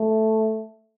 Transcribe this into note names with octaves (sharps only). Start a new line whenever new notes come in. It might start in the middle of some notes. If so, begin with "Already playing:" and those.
Already playing: A3